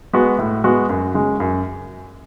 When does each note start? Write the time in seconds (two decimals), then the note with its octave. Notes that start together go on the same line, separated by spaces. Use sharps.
0.13 G#3 B3 F#4
0.38 A2
0.64 G#3 B3 F#4
0.89 F#2
1.14 C#3 G#3
1.40 F#2